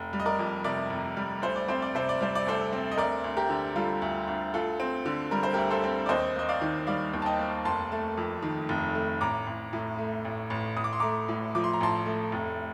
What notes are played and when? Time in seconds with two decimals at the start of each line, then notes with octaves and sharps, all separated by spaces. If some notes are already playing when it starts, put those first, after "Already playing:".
Already playing: F1
0.13 G3
0.20 D#5
0.26 A#4 D5
0.39 F2
0.64 C3 A#4 D5
0.90 F1
1.17 G3
1.42 D2 C5
1.56 D5
1.68 C4 C5
1.82 D5
1.95 C3 C5
2.09 D5
2.20 G3 C5
2.35 D5
2.46 D2 A4 C5
2.73 C4
2.92 D#5
2.98 D2 A#4 D5
3.24 D2
3.37 G4 A#4
3.50 D3
3.76 G3 F4 A4
4.02 D2
4.27 D2
4.54 D2 F4 A4
4.80 C4
5.06 D3
5.31 G3 A#4
5.43 C5
5.54 D2 G4 A#4
5.70 A4 C5
5.84 C4
6.06 D5
6.09 D#2 C5 D#5
6.36 A#3 D#5
6.49 D5 F5
6.62 D#3
6.87 G3 D5 F5
7.13 D#2
7.22 A5
7.26 D#5 G5
7.39 A#3
7.65 F1 A5 C6
7.92 A3
8.17 F2
8.43 D#3
8.69 F1
8.95 A3
9.21 A1 A#5 D6
9.47 A1
9.73 A2
9.99 A3
10.25 A1
10.50 A1
10.77 A1 D#6
10.84 D6
10.93 C6
11.00 A3 A#5 D6
11.29 A2
11.55 F3 D6
11.64 C6
11.73 A#5
11.81 A1 A5 C6
12.06 A3
12.32 F1